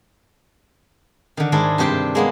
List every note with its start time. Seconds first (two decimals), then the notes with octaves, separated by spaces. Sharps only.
1.37 D3 D#3
1.52 G#2 D#3 G#3 D4 E4
1.78 G2 C3 G4 C5 G5 C6
2.15 G#3 A#3 B3